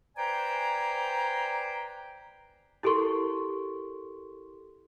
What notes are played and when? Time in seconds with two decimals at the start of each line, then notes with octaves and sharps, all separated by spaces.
0.17 B4 C5 D5 G5 G#5 A#5
2.83 E4 G4 A4 A#4 C6 C#6